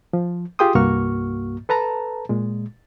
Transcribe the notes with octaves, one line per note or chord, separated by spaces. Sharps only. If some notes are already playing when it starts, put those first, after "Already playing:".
F3
F4 G4 G#4 G5 C6 D#6
C2 G2 A#3 F#4 C#6 F6
A4 B4 A5 A#5
A#2 G#3